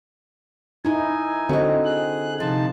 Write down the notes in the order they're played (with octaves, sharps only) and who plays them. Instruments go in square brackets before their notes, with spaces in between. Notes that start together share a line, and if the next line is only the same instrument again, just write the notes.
[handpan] D#4 E4 [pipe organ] G#5
[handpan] D3 C4 [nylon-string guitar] F#4 D#5
[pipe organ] G#4 F#6
[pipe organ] C3 D#4 A5 [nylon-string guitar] F3